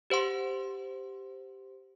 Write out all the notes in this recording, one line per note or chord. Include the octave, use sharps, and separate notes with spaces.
G4 C5 F#5 C6